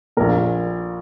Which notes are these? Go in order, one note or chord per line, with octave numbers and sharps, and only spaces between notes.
A#1 A#2 A#4